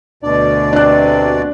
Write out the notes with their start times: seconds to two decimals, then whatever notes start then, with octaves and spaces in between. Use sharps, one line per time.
0.23 D2 B2 D4 D5
0.73 C3 D4 F#6